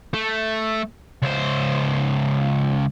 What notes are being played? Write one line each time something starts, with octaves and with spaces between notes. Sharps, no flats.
A3
C#2 C5